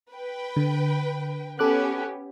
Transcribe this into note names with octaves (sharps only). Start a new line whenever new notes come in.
B4 G5
D3
B3 C#4 G4 A4 D6 F#6